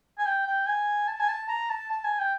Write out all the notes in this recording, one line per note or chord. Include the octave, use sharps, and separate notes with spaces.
G#5
G5
G5
G#5
A5
G#5
A5
A#5
A5
A5
G#5
G5